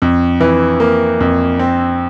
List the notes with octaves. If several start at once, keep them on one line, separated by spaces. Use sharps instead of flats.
F2
E3
A#3
F2
C4